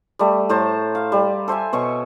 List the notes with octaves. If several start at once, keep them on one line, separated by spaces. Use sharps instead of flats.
G3 A3
A2 C5 A5 A#5
F5
G3
A4 C5 E5 G#5
B2 C#5 C#6